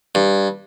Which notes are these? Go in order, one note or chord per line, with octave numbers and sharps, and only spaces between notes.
G2